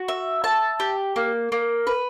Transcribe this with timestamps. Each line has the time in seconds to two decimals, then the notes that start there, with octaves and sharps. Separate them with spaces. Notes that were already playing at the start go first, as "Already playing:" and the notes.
Already playing: F#4
0.08 E5
0.44 A5
0.80 G4
1.16 A#3
1.52 A#3
1.87 B4